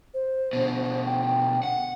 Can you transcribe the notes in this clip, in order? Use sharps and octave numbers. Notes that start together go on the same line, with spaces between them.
C5
B2 D3
G5
F#5